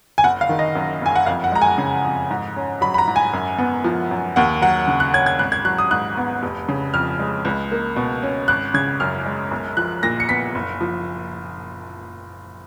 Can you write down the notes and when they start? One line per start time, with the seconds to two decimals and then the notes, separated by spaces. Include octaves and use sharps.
0.18 G#5
0.24 F#1 F#5
0.41 F5
0.49 D#3
0.59 D#5
0.75 F#2
1.01 F#1 G#5
1.16 F#5
1.26 F2 F5
1.44 F#5
1.52 G#3 A#5
1.62 G#5
1.78 C#3
2.05 F2
2.31 G#2
2.56 C#4
2.81 F#3 B5
2.94 B5
2.98 A#5
3.07 G#2
3.16 G#5
3.33 F#2
3.58 B3
3.84 F3
4.11 F#2
4.36 D#2 F#5
4.62 F#3 F#5
4.87 C#3
5.00 F#6
5.13 C#4 G#6
5.26 G#6
5.39 G#1 F#6
5.52 G#6
5.65 F#3 F#6
5.78 D#6
5.91 G#2 F#6
6.17 B3
6.43 F1
6.69 C#3
6.94 F2 F6
7.19 G#3
7.45 C#2
7.72 A#3
7.96 B2
8.23 C#4
8.48 G#1 F#6
8.74 C#3 G#6
9.00 F#2 F6
9.25 G#3
9.51 B1
9.77 F3 F#6
10.03 A#2 A#6
10.20 C#7
10.29 B3 B6
10.55 F#1
10.81 F3